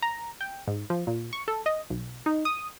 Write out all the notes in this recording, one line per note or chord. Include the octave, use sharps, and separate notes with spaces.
A#5
G5
G#2
F3
A#2
C#6
A4
D#5
B1
D#4
D#6